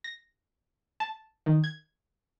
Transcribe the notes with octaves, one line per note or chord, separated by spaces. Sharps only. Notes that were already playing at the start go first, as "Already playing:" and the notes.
A#6
A5
D#3
G#6